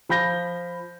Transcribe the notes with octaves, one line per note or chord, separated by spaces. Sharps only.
F3 B5 G6 A#6 G7